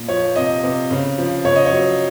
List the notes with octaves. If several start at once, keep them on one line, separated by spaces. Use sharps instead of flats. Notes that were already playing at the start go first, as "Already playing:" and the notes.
Already playing: A#2
F3 C#5
C3 D#5
C3
C#3
F3
C#3 C#5
D#5
C#5
F#3